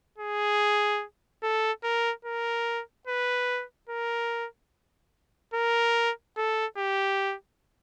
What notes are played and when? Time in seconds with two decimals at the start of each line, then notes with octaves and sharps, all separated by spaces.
0.18 G#4
1.43 A4
1.84 A#4
2.24 A#4
3.07 B4
3.89 A#4
5.54 A#4
6.37 A4
6.77 G4